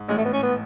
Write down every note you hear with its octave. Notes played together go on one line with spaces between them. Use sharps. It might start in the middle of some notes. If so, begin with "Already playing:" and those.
Already playing: G#2
A1 A2 G#3
A3
B3
C#4
B3